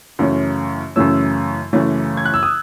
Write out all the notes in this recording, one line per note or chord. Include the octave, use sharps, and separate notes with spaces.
F#2 C#3 E3 A3 C#4
F#2 C#3 E3 A3 C#4 E6
F#2 C#3 E3 A3 C#4
G#6
F#6
E6
D#6